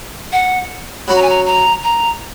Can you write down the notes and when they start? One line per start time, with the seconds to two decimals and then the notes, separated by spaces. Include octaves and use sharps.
0.32 F#5
1.08 F#3 C#4 F#4 B5
1.15 A#5
1.22 G#5
1.29 A#5
1.46 A#5
1.84 A#5